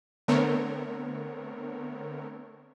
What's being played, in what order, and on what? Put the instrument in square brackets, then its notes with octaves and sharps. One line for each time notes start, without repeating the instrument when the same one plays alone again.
[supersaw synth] D3 A3 B3 C4 A#4 C#5